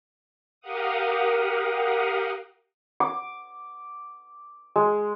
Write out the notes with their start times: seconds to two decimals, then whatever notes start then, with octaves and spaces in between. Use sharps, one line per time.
0.61 G4 A#4 F5 F#5 D#6
3.00 D6
4.76 G#3